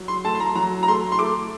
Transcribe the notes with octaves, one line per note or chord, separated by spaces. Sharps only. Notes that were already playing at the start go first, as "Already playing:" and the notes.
Already playing: F#3
C6
A3 A5
C6
A#5
F#3 A#5
A#5
A3 C6
C6
A3 D6